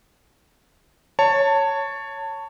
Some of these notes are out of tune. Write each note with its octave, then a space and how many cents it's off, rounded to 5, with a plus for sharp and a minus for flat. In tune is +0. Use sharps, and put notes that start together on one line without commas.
C#5 +0 A5 +20